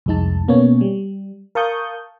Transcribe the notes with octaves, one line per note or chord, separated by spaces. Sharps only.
C2 F2 G#3 D#4 A5
B2 A#3 B3 C#4 C#5
G3
A#4 F5 A5 C#6 D#6 G6